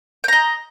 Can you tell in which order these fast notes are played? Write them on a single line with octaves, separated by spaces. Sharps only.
G5 A#5 D#5